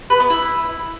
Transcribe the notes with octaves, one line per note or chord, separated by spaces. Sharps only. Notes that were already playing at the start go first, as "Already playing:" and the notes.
B4
B3
E4